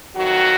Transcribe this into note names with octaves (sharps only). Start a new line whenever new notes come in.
F2 D#3 F#3 F#4